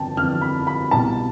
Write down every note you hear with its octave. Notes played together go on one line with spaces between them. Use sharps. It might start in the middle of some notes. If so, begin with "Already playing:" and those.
Already playing: G1 F2 C3 G5 A5
G1 F2 C3 E3 F6
B5
B5
C2 B2 A5